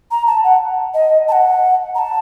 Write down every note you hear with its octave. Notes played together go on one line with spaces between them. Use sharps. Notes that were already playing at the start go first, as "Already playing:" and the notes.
A#5
A5
F#5
D#5
A5
F#5
A#5
A5